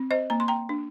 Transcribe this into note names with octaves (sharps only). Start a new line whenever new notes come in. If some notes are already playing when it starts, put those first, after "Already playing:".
Already playing: C4
C5 D#5
A#3 A#5
C6
G5 A#5
D4